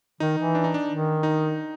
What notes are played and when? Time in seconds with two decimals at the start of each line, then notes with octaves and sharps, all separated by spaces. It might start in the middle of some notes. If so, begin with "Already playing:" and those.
0.20 D#3 D#4
0.37 E3
0.55 D4
0.64 D#4
0.74 D4
0.89 D#3
1.23 D#4